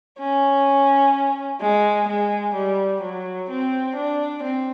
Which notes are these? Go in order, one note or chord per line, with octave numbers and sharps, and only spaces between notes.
C#4
G#3
G#3
G3
F#3
C4
D4
C4